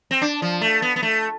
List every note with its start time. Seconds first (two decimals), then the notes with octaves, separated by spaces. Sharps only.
0.11 C4
0.22 D4
0.42 F3
0.61 A3
0.82 B3
0.96 B3
1.03 A3